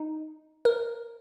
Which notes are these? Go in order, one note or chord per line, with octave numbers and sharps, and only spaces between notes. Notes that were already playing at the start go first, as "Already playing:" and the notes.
Already playing: D#4
A#4